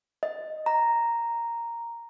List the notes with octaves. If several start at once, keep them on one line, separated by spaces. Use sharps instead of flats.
D#5
A#5